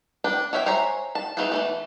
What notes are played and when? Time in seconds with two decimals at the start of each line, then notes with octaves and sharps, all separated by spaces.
0.24 D4 B4 G5
0.53 F#4 C#5 E5 F5 G5
0.66 C5 C#5 E5 G#5 A#5
1.15 A5
1.37 B3 D#4 E4 F#4 G#4
1.52 E3 F3 A3